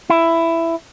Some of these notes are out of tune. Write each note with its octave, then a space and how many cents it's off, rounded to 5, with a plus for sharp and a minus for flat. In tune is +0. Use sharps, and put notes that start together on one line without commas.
E4 +10